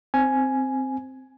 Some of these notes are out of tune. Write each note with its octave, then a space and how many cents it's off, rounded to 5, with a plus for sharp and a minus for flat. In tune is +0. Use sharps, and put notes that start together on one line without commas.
C4 +0 G#5 +10